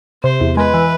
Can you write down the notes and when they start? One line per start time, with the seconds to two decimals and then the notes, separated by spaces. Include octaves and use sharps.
0.24 C3 C5
0.41 E2
0.57 G#3 B4
0.74 E3